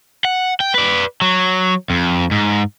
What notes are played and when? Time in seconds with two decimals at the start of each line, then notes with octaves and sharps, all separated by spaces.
0.25 F#5
0.60 G5
0.74 B4 D5
1.22 F#3
1.90 F2
2.31 G#2